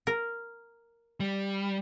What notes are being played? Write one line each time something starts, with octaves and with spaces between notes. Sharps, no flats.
A#4
G3